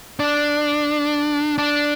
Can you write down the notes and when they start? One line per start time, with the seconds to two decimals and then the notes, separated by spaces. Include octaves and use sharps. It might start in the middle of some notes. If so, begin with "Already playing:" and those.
0.20 D4
1.58 D4